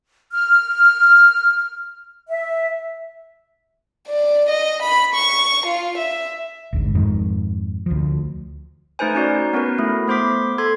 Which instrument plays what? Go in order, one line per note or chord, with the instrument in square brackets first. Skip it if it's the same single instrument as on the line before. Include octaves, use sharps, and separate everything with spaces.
[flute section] F6
E5
[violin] D5
D#5
B5
C#6
F4
E5
[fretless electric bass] G#1 D2 G#2
F2 G#2 D#3
D2 F3
[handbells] A3 D#4 B4 C5 G#5
C#4 D#4 F#4 D5
B3 C#4 F#4 A#4 B4
A3 E4
A3 B3 C5 C6 D6 B6
A4 C6 G#6